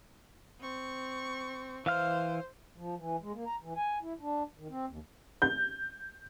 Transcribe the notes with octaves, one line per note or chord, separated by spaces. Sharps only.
C4 C#6
E3 C5 F5 F6
F3
E3
G#3
A#3
A#5
E3
G#5
E4
D4
D#3
C4
D#2
G6